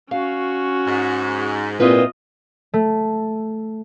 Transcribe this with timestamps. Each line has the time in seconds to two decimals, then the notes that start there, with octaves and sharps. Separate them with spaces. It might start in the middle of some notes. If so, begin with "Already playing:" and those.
0.11 C#4 F#4 F5
0.87 G#2
1.80 A#2 C4 E4 F4 B4 D#5
2.74 A3